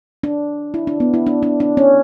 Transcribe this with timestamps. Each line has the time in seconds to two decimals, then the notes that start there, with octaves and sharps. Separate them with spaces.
0.23 D4
0.74 E4
0.87 D4
1.00 B3
1.14 E4
1.27 D4
1.43 D4
1.60 D4
1.77 C#4